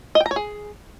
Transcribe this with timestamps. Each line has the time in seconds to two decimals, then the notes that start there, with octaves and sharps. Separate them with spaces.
0.15 D#5
0.20 G5
0.26 A#5
0.31 C#5
0.36 G#4